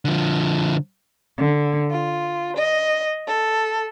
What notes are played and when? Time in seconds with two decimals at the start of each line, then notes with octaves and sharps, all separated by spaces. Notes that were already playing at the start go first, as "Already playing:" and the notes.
0.05 D3 F3
1.37 D3
1.90 F4
2.57 D#5
3.27 A4